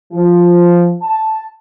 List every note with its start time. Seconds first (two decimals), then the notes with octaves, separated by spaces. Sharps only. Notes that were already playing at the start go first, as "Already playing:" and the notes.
0.13 F3
1.02 A5